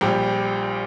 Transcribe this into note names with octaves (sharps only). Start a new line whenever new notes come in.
A#1 A#2 G3 G4